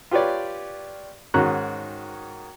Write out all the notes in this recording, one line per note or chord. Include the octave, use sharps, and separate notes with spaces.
F4 G4 B4 C#5 D5
G#2 D#3 C#4 F#4 A#5 F#6